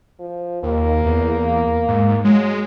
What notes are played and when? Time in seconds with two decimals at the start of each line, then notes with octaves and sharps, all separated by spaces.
0.19 F3
0.63 D#2 A#3
1.05 E2
1.88 G#2
2.24 F#3 G#3